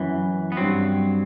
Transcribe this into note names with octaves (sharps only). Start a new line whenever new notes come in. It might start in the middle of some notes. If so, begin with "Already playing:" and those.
Already playing: F#2 E3
B3
G2 F#3 C4